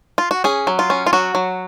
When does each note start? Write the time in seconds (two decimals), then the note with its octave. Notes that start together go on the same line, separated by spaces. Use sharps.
0.18 F4
0.31 F#4
0.44 C#4 G#4
0.67 F#3
0.79 F4
0.90 C#4
1.07 F4
1.13 F#3 F#4
1.35 F#3